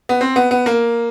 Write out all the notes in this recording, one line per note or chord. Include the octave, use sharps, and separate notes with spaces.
B3
C4
B3
B3
A#3